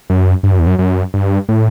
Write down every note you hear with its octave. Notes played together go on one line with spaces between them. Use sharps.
F#2
G2
F#2
E2
F#2
F#2
G2
A2